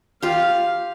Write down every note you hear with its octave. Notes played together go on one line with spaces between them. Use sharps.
F4 G4 F5